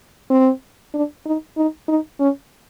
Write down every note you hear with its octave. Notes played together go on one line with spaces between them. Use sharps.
C4
D4
D#4
D#4
D#4
C#4